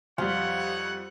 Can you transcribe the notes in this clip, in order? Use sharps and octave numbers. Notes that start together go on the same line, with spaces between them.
F2 G3 D#4 F4 C#5 F#5